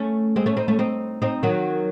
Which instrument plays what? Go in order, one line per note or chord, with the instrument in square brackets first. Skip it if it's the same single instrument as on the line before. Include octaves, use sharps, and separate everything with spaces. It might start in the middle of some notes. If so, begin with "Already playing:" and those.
Already playing: [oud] A3 C#4
G#3 C4
A3 C#4
C4 D#4
A3 C#4
C4 D#4
C4 D#4
D#3 F#3